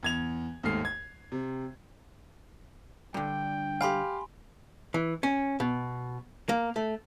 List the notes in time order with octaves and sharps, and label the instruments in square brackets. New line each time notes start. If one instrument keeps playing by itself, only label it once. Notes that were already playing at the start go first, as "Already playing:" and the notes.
[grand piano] E2 G#6 F7
D#2 G#2 A3 F6 C7
G#6
C3
[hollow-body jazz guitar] G2 D3 [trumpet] G5
[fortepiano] G4 F5 [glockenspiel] G#5 B5 C6
[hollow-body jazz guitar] E3
C#4
B2
A#3
A3